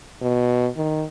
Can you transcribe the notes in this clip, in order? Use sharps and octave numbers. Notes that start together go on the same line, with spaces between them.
B2
D#3